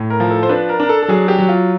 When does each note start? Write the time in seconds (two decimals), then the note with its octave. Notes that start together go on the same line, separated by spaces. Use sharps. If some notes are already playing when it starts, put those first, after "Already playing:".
Already playing: A2
0.10 A#4
0.20 F3
0.30 A4
0.43 C5
0.49 D4 B4
0.69 A#4
0.80 D4 A#4
0.89 A4
1.03 A4
1.08 F#3 G#4
1.28 G4
1.38 F#3
1.49 F4